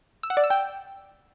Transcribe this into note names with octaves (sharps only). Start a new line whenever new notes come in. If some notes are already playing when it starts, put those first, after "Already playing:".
E6
F#5
D5
E6
G5